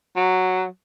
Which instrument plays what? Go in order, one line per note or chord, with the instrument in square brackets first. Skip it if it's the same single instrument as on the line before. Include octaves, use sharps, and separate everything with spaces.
[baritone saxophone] F#3